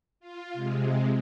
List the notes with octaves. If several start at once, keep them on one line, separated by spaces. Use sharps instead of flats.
F4
C3 G#3